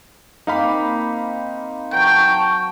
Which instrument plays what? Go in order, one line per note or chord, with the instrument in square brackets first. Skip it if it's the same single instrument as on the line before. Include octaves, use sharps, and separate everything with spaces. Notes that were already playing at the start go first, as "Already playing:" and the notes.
[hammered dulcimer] A#3 C4 D6 [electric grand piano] D#4 F5 B5
[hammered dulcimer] F#3 B4 [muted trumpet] G5 [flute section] A5 C#6